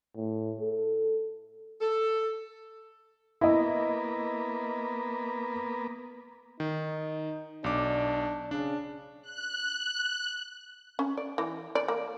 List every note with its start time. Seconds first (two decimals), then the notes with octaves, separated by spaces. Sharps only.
0.16 A2
0.60 A4
1.80 A4
3.41 A#3 B3 E4 D#5
6.60 D#3 D#4
7.64 B1 D4 D6
8.51 C#3 D4
9.22 F#6
10.99 C#4
11.17 D5
11.38 E3
11.75 D5
11.88 A#3